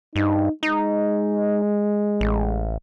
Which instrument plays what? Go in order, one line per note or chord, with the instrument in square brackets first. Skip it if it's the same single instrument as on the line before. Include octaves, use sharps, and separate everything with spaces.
[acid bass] G2 [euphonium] D#4
[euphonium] G#3 [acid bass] D#4
[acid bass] A1